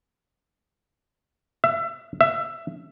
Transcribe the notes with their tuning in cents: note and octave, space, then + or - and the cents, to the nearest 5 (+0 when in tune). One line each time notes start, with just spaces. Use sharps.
E5 +30
E5 +20